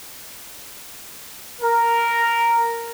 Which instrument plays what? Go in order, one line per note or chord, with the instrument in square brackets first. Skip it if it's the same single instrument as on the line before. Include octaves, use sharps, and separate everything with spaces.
[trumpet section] A#4